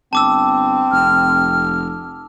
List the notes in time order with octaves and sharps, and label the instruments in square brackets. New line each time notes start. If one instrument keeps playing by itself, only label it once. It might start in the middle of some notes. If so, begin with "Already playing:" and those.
[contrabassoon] G1 [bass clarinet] C4 [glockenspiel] A5 D6 E6
[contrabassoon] F1 [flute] F6